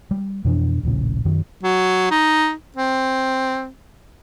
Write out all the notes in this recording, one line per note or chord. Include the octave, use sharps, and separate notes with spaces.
G3
F2 B2 E3 D4
D#1 A#1 A2 C#3
F#2 D#3 F#3
F#3
D#4
C4